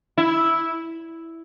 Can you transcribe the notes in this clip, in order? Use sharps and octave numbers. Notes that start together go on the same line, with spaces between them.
E4